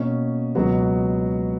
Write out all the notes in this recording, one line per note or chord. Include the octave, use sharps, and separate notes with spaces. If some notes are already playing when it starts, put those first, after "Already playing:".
Already playing: B2 A#3 C#4
C#2 B2 F#3 B3 F#4